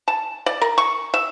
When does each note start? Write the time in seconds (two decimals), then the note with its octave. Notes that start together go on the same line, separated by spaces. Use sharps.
0.08 A5
0.46 D5
0.61 A#4
0.78 C#6
1.14 E5